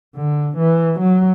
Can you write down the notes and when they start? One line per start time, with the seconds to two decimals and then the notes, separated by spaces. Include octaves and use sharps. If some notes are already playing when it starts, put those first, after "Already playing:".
0.16 D3
0.58 E3
1.00 F#3